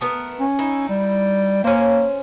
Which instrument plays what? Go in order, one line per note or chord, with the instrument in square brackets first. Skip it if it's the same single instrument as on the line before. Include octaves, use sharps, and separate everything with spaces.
[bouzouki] A3 B3 A#4
[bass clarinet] C#4
[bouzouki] D#4 E4
[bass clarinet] G3
[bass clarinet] A#3 [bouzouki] C#4 C5